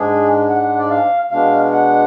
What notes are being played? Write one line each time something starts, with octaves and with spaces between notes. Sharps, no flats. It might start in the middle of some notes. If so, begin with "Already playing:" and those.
Already playing: G#2 G#3 D4 G#4
F#5
D5
F5
B2 G#3 D4 F5
F#5